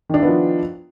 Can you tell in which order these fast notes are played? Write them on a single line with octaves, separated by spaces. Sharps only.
D#3 D4 E4 B3 F3